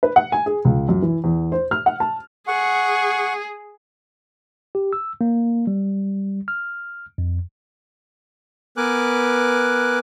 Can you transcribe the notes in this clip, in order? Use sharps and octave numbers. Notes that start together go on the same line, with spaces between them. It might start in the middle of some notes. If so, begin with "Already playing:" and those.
B4
F#5
G#5
G#4
C#2
F#2
E3
E2
C5
F6
F#5
A5
G#4 F#5 C#6
G4
E6
A#3
G3
F6
F2
B3 A#4 B4 G#5 D6 F#6